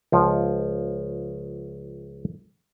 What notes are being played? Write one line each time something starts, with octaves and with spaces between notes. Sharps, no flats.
C#2 F3